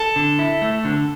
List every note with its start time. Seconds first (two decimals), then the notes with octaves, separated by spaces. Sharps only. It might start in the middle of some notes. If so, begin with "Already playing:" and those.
Already playing: A4
0.16 D3
0.39 E4
0.62 A3
0.85 D3